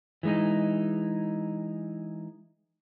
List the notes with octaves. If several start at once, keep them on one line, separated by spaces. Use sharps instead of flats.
E3 G#3 D#4